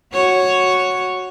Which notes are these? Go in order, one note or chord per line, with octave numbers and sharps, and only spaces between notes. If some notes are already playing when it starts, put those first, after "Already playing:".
F#4 C#5